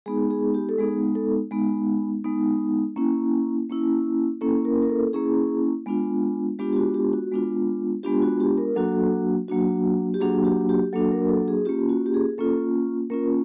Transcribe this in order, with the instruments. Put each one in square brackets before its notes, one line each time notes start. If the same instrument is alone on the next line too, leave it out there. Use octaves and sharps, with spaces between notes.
[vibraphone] G#3 B3 D#4 G#4
G#4
G4
A4
G#3 B3 D#4 G#4
A4
G#3 B3 D#4
G#3 B3 D#4
A#3 C#4 E4
A#3 C#4 E4
A#3 C#4 E4 A4
A#4
A#4
A4
A#3 C#4 E4 G#4
G#3 B3 D4 F4
G#3 B3 D4 F4 G4
G4
F#4
G4
F#4
G#3 B3 D4 F4
G#3 B3 D4 F4 G4
F#4
G4
A#4
F#3 A#3 D4 F#4 A4
F#3 A#3 D4 F#4
G4
F#3 A#3 D4 F#4 G#4
G4
G4
F#3 A#3 D4 F#4 A4
A#4
A4
G#4
A#3 C#4 F4 G4
F#4
G4
G#4
A#3 C#4 F4 A4
A#3 C#4 F4 A#4